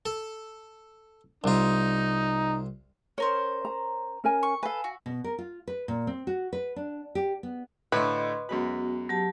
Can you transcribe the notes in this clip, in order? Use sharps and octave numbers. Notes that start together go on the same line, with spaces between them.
A4
C2 D#4 F4
C#4 A#4 C5 C#5
A#5
C#4 A#4 G#5
C#6
A4 B4 F5 G#5
F#4
B2
A#4
F4
B4
A#2
C4
F#4
B4
D4
G4
B3
A2 D3 A3 B4 D#5 C6
F#2 G#3 B3 F#4 B5
F#3 G4 A5